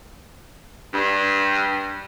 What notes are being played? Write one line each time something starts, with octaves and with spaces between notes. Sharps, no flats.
G2